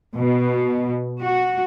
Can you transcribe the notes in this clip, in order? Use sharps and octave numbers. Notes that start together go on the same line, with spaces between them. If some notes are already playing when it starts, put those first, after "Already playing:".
B2
F#4